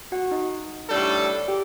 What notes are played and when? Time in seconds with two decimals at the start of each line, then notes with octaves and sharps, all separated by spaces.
0.12 F#4 F#5
0.31 D#4 D#5
0.90 A2 G3 D4 A4
1.48 G4 G5